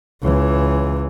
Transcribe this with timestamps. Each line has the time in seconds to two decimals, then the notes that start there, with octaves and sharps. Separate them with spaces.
0.22 C#2 E3